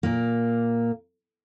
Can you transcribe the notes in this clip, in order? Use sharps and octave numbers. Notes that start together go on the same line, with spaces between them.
A#2 A#3